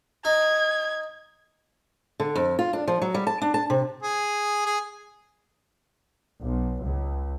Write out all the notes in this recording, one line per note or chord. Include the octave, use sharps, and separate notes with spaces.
D#4 G#6
D3
F2
F4
D4
F3
F#3
G3
A5
D4
A5
C3
G#4
G#4
B1
C#2